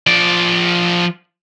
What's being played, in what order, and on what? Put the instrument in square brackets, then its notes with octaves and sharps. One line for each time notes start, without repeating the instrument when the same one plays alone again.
[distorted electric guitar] F3 D5